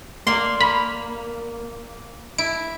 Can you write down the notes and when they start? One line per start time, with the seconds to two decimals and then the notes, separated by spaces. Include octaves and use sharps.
0.27 A#3 D5 C6
0.61 A#3 B5
2.38 E4 D7